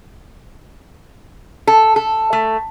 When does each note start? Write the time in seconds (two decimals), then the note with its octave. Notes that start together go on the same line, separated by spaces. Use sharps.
1.67 A4
1.96 A4
2.33 A3